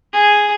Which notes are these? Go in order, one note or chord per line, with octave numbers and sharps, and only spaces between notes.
G#4